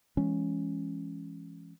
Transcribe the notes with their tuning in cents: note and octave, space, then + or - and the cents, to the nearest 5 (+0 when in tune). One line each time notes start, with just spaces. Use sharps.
E3 +30 G#3 +0 C#4 +0